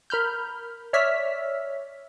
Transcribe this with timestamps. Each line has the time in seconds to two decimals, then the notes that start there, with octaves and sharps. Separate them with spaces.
0.10 A#4 B5 F6 G6
0.93 C#5 D5 E5 E6 F6 B6